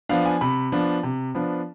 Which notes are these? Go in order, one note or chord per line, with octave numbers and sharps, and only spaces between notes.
F3 B3 D4 F5
G#5
C3 B5
F3 B3 D4
C3
F3 B3 D4